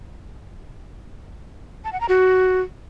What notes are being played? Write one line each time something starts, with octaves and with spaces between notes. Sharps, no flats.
A5
F#5
A#5
F#4